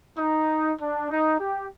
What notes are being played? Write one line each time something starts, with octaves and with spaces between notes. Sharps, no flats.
D#4
D4
D#4
G4